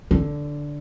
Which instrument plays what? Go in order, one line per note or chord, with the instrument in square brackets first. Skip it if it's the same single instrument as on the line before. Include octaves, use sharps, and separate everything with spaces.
[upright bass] D3